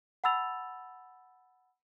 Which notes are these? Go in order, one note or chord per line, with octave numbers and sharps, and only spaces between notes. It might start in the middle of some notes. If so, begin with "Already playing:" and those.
F#5 A5 B5 E6 A6 F7